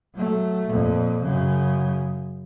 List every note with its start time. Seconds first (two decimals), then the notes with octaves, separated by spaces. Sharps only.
0.14 F#3 A3
0.69 F2 A#2
1.22 F#2 C#3